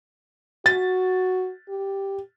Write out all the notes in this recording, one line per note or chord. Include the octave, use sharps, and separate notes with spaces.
F#4 A6
G4